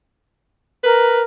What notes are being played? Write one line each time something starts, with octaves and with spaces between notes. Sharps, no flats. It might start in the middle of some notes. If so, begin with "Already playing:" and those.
A#4 B4